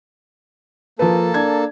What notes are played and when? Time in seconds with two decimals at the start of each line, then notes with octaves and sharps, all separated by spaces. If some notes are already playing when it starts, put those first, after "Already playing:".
0.99 F3 A#3 A4 B4 A5
1.34 D4 G#6